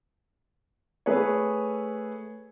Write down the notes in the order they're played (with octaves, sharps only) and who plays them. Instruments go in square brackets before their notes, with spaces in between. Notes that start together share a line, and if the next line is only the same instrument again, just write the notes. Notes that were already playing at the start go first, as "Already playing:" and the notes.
[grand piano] A3 G#4 B4 C#5